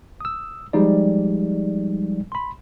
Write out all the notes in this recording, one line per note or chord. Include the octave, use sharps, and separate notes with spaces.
D#6 E6
F3 G3 G#3 D#4 D5
B5 C6